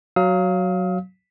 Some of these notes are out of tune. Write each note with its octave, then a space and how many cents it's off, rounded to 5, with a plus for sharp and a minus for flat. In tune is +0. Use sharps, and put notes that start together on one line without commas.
F#3 +0 F5 +0 D#6 +40